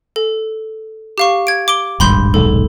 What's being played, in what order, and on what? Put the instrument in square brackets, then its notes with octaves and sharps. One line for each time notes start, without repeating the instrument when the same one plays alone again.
[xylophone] A4
G4 F5 C#6
G#6 D7
D6 D7 G7
[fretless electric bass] D#1 G#1 G2 [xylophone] B5 C6 G6
[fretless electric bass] D#1 B1 G#2 [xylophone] A4